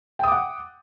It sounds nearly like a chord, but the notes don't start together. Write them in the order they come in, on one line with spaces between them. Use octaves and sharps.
G5 D#6 D6 F#5